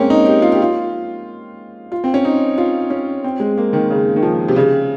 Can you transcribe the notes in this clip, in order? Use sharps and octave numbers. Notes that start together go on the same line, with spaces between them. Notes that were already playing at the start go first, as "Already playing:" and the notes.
Already playing: G#3 A#3 C4 C#4
D#4
G4
F4
G4
F4
F4
C4
C#4
D#4
F4
C#4
C4
G#3
A#3
D#3
C#3
D#3
F3
C3
C#3